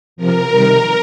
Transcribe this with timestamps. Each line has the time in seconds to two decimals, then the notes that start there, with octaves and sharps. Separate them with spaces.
0.16 C3 F3 A#4
0.50 C3 D#3 G3